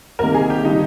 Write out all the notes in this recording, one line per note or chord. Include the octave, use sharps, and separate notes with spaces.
C2 C3 D#3 A#3 A#4
G#4
G4
D#3 G3 D4 D#4 F4